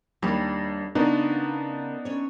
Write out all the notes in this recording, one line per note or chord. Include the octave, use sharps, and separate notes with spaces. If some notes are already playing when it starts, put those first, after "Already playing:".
D#2 G3 A#3 D4
C#3 B3 D4 D#4 F4 A#4
C#4 C#5